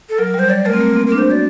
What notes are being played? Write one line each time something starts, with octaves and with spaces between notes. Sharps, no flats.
A4
F#3 A#4
G3 C5
G3 D5
A3 A#4
C4
A#3
C4
A#4
D4
C5
F#4 D5